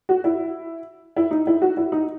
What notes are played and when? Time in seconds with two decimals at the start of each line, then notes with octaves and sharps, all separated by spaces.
0.09 F#4
0.24 E4
1.16 E4
1.31 D#4
1.47 E4
1.62 F#4
1.77 E4
1.92 D#4